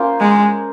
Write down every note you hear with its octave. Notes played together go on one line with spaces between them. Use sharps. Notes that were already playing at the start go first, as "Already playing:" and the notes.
Already playing: A#3 C#4 F4 C5
G#3